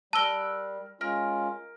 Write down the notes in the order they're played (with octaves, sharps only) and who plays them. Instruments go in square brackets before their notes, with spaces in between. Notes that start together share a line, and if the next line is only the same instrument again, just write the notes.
[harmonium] G3 [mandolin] A#4 E6 F#6 [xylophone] A5 G7
[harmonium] G#3 C#4 F4 [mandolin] A#4